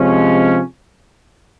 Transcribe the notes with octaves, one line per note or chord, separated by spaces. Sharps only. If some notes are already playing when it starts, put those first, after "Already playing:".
Already playing: C3 F3 G#3 C#4